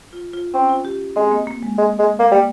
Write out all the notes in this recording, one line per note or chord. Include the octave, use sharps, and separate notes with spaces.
F4
F4
C4 C#4
F4
G4
G#3 C4
A#3
A#3
G#3
G#3
G#3
A#3
G3
A#3